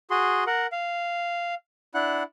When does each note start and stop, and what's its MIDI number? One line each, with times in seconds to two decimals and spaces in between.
0.10 0.44 66
0.10 0.44 68
0.10 0.44 84
0.47 0.67 70
0.47 0.67 78
0.72 1.55 77
1.95 2.23 62
1.95 2.23 64
1.95 2.23 78
1.95 2.23 90